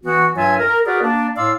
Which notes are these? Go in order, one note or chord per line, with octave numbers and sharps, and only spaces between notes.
E3 B3 F#4
G2 F#3 F4 E5 G#5
A#4
F#4 G#4 A#4 B4 D5
A#3 D4
A2 D5 F5 C6 E6